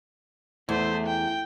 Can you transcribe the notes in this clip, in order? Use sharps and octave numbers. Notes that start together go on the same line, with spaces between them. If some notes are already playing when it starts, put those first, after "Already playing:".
E2 A3 C5
G5